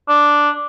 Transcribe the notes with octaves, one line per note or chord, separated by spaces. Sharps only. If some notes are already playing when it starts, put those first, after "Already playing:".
D4